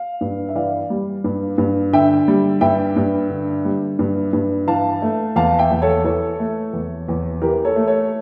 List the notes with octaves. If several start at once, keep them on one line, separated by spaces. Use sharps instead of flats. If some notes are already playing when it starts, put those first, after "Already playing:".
Already playing: F5
G2
E5
E3 D5 F5
G3
G2
G2
D3 E5 G5
G3
G2 E5 G5
G2
D3
G3
G2
G2
E3 F5 A5
A3
E2 F5 A5
E5 G5
E2
A4 C#5
E3 A4 C#5
A3
E2
E2
E3 G4 A#4
A4 C#5
A3
A4 C#5